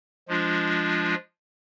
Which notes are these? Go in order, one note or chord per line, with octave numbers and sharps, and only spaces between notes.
F3 G#3 D4 F4